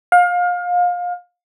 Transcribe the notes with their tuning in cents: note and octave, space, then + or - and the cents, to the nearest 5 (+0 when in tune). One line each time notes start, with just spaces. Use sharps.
F5 +30